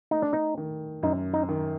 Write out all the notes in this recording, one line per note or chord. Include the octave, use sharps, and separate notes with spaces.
A3 D#4
D4
D#4
D#3
F#2 D#4
D#4
D#3